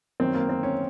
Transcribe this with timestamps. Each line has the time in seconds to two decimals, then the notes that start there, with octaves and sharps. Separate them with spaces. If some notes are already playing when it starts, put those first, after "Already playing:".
0.20 F#2 D#3 C4
0.34 A#3
0.49 C4
0.63 C#4